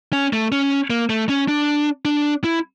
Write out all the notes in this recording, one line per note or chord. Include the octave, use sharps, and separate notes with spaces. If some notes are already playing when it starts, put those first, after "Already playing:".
C#4
A3
C#4
A#3
A3
C#4
D4
D4
E4